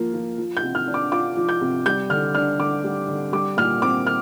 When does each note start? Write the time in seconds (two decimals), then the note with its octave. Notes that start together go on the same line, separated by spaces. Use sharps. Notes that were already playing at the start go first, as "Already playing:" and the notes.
Already playing: F3 A#3 F4
0.14 F3
0.38 F3
0.57 G6
0.63 C3
0.75 F6
0.88 D4
0.94 D6
1.12 F4 D6
1.37 F3
1.49 G6
1.61 C3
1.86 G3 G6
2.10 D3 F6
2.35 D4 F6
2.60 D3 D6
2.84 G3
3.08 D3
3.33 G3 D6
3.57 A#2 F6
3.82 C4 D6
4.07 F6